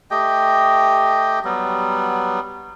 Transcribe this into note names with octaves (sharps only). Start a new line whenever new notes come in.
A3 G4 D#5 G5
F#3 G3 B3